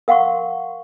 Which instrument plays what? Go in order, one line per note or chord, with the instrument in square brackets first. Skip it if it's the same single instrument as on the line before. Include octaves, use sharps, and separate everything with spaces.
[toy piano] A#4 F5 F#5 C6 C#6